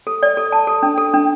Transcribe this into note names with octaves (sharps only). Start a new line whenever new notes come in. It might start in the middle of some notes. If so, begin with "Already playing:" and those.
A4
D5
A4
A5
A4
D4
A4
D4